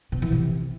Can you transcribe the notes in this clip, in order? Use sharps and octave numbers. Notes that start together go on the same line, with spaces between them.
B2
E3
C3